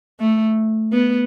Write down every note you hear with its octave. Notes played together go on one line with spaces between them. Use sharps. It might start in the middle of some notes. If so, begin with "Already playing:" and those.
A3
B3